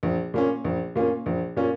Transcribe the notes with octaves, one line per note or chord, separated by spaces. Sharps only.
A#1
A#2 A#3 C#4
A#1
A#2 A#3 C#4
A#1
A#2 A#3 C#4